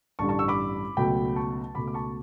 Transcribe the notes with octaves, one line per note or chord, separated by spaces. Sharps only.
A1 G2 D3 G3 A5 C#6
A5 C#6
C#6 E6
B5 D6
C#2 B2 F#3 A3 G5 B5
A5 C#6
C#2 B2 A3 B5 D6
D6
A5 C#6